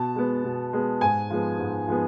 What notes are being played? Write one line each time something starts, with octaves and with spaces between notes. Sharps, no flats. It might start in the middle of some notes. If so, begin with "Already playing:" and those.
Already playing: B2 A5
G#3 B3
B2
G#3 B3
G#2 G#5
F3 G#3 B3
G#2
F3 G#3 B3